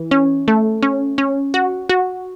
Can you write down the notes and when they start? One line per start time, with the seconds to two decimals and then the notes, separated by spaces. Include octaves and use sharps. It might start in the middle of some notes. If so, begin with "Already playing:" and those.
Already playing: E3
0.11 C#4
0.48 A3
0.83 C#4
1.18 C#4
1.54 F#4
1.89 F#4